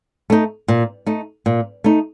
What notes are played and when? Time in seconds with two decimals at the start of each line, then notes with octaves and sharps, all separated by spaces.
0.30 A3 D#4
0.68 A#2
1.06 A3 D#4
1.46 A#2
1.84 A3 D#4